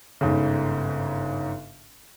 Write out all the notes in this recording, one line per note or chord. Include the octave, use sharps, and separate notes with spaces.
G1 G#2 C#3